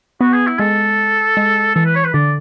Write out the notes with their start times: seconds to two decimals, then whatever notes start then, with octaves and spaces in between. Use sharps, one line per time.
0.21 B3 F#4
0.34 G#4
0.47 E4
0.59 G#3 A4
1.37 G#3
1.75 E3 A4
1.85 B4
1.95 C#5
2.04 B4
2.14 D3 D5